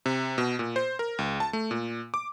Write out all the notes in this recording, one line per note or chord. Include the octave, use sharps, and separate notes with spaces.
C3
B2
A#2
C5
A#4
C#2
A5
A3
A#2
D6